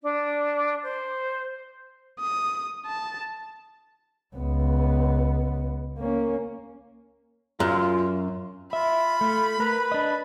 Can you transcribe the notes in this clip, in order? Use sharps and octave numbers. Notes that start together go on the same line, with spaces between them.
D4
C5
D#6
A5
C#2 B3
A#3 C#4
F#2 F4
F4 E5 B5
A3 F4
A#4 B4
D4 D#5